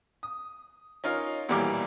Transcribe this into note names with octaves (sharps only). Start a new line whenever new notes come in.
D#6
C#4 D#4 F4 A#4
B1 A#2 E3 G3 A#3 D6